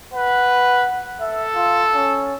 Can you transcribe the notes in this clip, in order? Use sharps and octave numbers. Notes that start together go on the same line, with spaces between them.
B4 F#5
A4 E5
F4
C#4